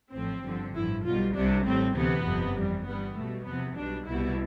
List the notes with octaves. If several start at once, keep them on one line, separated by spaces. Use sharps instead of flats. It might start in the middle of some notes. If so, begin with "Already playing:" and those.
A1 A2 F3 C4
G1 G2 D3 F3
A1 G2 F3 E4
B1 B2 G3 F4
C2 C3 G3 D4
A1 A2 G3 C4
D2 C3 E3 B3
G1 F2 C3 F3
F2 E3 G3
G1 G2 E3 G3 B3
B1 B2 G3 A3
E2 C3 F3 B3
B1 B2 G3 D4
C2 B2 G3 E4